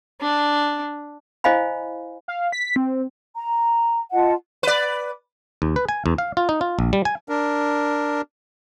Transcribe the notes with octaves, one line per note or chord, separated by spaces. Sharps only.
D4
E4 C5 D#5 F5 G#5 B5
F5
B6
C4
A#5
F4 D#5 F#5 A5
B4 D5
D#2
B4
G#5
E2
F5
F4
D#4
F4
A#1
G3
G#5
D4 A#4